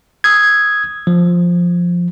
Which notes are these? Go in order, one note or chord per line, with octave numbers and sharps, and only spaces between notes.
D#6 E6 G#6
F3